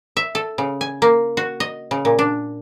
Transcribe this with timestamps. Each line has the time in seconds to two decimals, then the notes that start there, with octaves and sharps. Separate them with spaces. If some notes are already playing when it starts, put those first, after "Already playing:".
0.17 E5
0.35 A4
0.58 C#3
0.81 G#5
1.02 A#3
1.37 F#4
1.60 D#5
1.91 C#3
2.05 A#2
2.19 D4